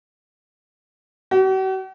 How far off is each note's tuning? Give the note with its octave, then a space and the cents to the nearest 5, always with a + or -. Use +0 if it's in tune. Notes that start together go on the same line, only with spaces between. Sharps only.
F#4 +45